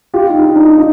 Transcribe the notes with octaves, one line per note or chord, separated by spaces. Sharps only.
F4 G4
D#4
D#4
D4
D#4
D#4 F4